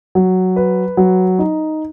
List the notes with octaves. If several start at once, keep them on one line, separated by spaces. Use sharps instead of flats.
F#3
B4
F#3
D#4